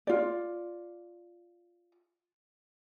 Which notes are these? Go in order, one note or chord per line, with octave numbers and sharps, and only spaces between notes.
F4 D5